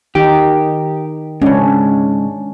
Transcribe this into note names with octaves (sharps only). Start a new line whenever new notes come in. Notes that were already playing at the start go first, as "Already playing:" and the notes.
D#3 D#4 G4
G#2 C#3 C#4 D4